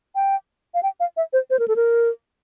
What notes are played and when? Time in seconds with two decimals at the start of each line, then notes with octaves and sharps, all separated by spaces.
0.15 G5
0.74 F5
0.83 G5
1.00 F5
1.17 E5
1.33 C5
1.50 C5
1.59 A#4
1.68 A4
1.76 A#4